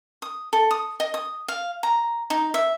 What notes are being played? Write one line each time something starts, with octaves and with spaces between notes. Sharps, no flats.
D#6
A4
D#6
D#5
D#6
F5
A#5
D#4
E5